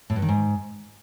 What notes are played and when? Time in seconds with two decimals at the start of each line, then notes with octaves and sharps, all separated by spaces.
0.10 A2
0.16 G2
0.22 D#3
0.29 G#2